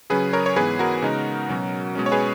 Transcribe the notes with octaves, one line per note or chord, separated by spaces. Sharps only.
C#3 F#3 C#4 G#4 B4
A#4 C#5
C#5
G#2 E3 B3 G#4 B4
F#4 A#4
C#3 G#3 B3 D#4
B2 F#3 C#4
B2 G#3 C#4
C#5
G#4 B4